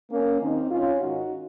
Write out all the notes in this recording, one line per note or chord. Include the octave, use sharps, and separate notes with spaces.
A#3 C#4
D#2 D#3 C4 D#4
C#4 F4
G#2 D#3 D#4 F#4